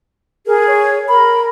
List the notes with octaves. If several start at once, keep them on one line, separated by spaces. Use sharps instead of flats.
G#4 A#4
C#5
A#4 B5